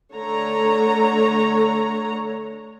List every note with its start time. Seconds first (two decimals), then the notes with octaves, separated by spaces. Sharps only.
0.13 D3 A3 C#5 A#5